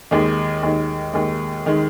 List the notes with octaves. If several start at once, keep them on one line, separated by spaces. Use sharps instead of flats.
D#2 D#3 G#3
D#2 D#3 G#3
D#2 D#3 G#3
D#3 G#3